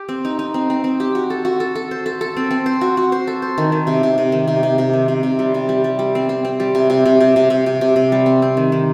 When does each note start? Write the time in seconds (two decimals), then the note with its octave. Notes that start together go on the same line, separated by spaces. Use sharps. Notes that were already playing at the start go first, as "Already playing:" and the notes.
Already playing: G4
0.09 C4
0.25 D#4
0.39 D#4
0.54 C4
0.70 C4
0.84 C4
1.00 G4
1.15 F#4
1.30 A4
1.45 F#4
1.60 A4
1.75 A4
1.91 C5
2.06 A4
2.21 A4
2.37 C4
2.51 C4
2.66 C5
2.81 F#4
2.97 F#4
3.12 C5
3.27 A4
3.42 C5
3.58 D#3
3.72 D#3
3.87 C3
4.03 C3
4.18 C3
4.32 D#3
4.48 C3
4.63 C3
4.78 C3
4.93 D#3
5.08 C3
5.23 C3
5.39 G3
5.54 C3
5.69 G3
5.84 G3
5.99 G3
6.15 C4
6.29 C4
6.45 C4
6.60 G3
6.75 C3
6.90 C3
7.06 C3
7.20 C3
7.36 C3
7.50 C3
7.66 C3
7.81 C3
7.96 C3
8.12 G3
8.26 C4
8.42 C4
8.57 D#3
8.72 D#3